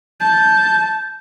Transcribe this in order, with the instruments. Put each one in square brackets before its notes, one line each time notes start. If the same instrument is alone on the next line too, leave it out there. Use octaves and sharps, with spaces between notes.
[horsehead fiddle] A5 [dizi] G6